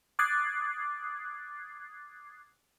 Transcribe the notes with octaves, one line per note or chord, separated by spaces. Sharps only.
D6 D#6 F#6 G#6 A6 C7